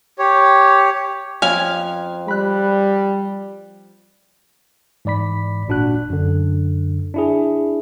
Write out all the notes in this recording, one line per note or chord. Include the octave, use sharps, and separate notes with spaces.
G4 C#5
F2 C#4 F5 G#5
G3 B5 F#6
G#2 E3 D5 B5 B6
G1 A#2 D4 F#4 F#6
F#2 D3
D4 E4 G#4